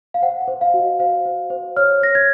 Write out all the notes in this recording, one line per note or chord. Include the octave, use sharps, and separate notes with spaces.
F5
C5 F#5
F#5
C5
F5
F#4
D#5
C5 F5
C5
C5
C#5 F6
C#5 A#6
G#6